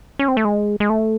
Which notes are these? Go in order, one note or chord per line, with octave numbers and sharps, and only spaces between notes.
C#4
C4
A3
G#3
G#3
A3